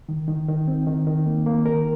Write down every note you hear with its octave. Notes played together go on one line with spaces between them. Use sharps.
D#3
D#3
D#3
C4
D#3
D#3
A#3
A#3
D#3 A#4